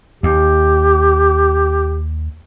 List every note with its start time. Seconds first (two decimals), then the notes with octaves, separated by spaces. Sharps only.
0.23 D#2 G4